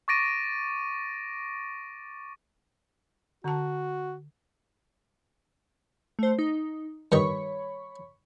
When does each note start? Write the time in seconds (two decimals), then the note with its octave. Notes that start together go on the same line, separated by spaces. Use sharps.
0.08 C#6 D6 A6 A#6 D7 D#7
3.44 D3 F#4 A5
6.19 A3 C5
6.39 D#4
7.12 G2 D#3 D#4 C#5 B5 C#6